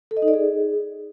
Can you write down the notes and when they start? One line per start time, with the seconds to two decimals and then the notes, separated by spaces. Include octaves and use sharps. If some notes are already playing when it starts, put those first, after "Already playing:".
0.11 A4
0.17 D#5
0.22 D#4
0.28 D5
0.33 G#4